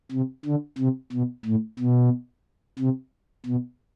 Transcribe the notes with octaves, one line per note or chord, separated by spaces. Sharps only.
C3
D3
C3
B2
A2
B2
C3
B2